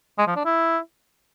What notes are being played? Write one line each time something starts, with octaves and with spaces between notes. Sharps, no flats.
G#3
F3
D4
E4